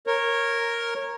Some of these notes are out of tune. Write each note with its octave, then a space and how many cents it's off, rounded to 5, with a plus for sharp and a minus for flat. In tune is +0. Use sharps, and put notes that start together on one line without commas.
A#4 +0 C#5 -15